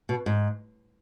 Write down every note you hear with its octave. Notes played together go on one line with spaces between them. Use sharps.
B2
G#2